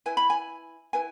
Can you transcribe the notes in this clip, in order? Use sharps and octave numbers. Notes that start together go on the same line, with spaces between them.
E4 B4 G#5
B5
G#5
E4 B4 G#5